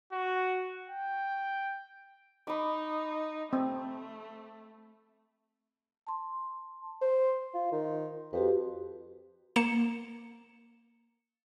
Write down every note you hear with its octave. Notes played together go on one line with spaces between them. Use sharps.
F#4
G5
D#4 B5 D6
A3 C4
A5 C6
C5 C6
F4
D#3
F2 F#4 G4 B4
A#3 C#7 E7